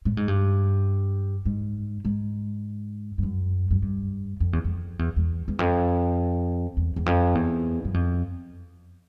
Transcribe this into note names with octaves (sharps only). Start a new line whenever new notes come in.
A2
G#2
G2
G#2
G#2
G2
F#2
F#2
G2
F2
E2
F2
E2
E2
E2
F2
E2
E2
F2
E2
F#2
F2